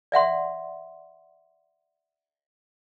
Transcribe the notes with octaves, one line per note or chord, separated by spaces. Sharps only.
D5 E5 F#5 C6